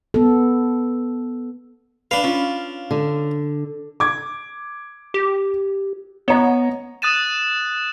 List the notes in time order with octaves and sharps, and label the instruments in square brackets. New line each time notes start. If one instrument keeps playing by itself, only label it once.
[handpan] B3 A4
[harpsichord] D4 F5 [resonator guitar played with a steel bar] B4
[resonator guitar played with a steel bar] C#4 F4
[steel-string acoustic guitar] D3
[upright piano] D6 G#6
[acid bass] G4
[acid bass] B3 [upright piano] C#5 D#5 A#5
[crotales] D#6 F#6 A6 D#7 E7